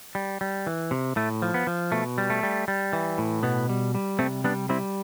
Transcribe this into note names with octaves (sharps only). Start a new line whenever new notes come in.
G3
G3
E3
C3
A2 A3
F3
B3
F3
B2 A3
G3
A3
G3
G3
E3
A2
B2 B3
G3
G3
C3 A3 C4
G3 B3 D4
G3 C4 E4